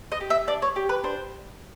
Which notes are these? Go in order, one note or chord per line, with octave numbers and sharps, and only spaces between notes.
D#5
G4
E5
D4 D5
C#5
G4
B4
D4 C5